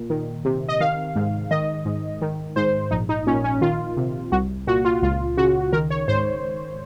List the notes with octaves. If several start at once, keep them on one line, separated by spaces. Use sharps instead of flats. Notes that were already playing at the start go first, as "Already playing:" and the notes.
Already playing: A#2
D#3
C3
D#5
D#3 F5
G#2
D#3 D#5
G#2
D#3
G#2 C5
A#1 D#4
D#4
A#2 C#4
C#4
D#3 F4
C3
C2 F#4
A#2 F#4
F4
C#2 F4
C#3 F#4
D#3 A#4
C#5
G#2 C5